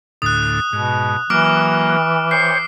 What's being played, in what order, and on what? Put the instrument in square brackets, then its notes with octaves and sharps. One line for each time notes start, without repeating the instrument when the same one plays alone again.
[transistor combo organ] D2 A2 [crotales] D#6 F#6
[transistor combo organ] G#2 [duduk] B2
[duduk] E3 [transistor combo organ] F#3 A#3 [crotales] D6 F6 D7
[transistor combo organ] C5 C#5 G5 [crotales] C7